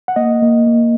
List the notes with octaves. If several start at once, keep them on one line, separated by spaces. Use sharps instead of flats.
F#5
A#3 D#5
A#3
A#3